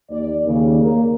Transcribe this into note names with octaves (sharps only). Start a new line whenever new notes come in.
D#2 D5
D#2 C#3
A#3